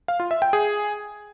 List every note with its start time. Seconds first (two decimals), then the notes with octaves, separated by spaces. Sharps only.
0.08 F5
0.20 F4
0.31 E5
0.42 G5
0.53 G#4